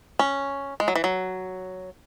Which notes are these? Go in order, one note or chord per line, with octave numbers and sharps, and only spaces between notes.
C#4
G#3
F#3
E3
F#3